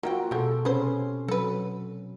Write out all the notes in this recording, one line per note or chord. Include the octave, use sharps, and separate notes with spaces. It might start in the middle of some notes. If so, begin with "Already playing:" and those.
A#3 F4 F#4 E5 G5
B2 G#3 G4 A4
C3 C#4 G#4 B4 C5
F#3 A4 B4